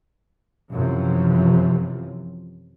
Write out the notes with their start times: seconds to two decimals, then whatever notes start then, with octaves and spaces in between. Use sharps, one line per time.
0.71 F#2 C3 E3 F3